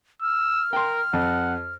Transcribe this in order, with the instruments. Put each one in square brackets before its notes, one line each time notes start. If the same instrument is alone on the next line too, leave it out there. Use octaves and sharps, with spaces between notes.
[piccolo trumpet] E6 [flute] F6
[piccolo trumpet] A#4 [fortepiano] G5 C6
[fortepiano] F2 [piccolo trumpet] F#5